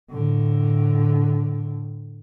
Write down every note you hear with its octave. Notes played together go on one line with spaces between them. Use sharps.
A2 D3